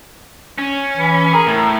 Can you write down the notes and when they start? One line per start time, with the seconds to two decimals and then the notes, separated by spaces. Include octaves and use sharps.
0.58 C#4
0.97 E3
1.33 G#4 A#4
1.46 A2